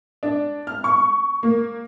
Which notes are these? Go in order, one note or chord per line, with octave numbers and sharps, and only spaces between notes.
D4
F6
C#6
A#3